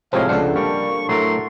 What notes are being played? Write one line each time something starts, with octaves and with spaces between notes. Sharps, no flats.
A2 C3 F3 G#3 C4 C#5 F5
C#2 D4 A4 C5 F#5
G3 A#3 C#6
A2 F#3 A3 A#4 C6